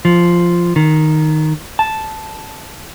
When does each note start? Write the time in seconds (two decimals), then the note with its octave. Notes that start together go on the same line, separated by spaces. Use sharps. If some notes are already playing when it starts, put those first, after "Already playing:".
0.05 F3
0.76 D#3
1.79 A5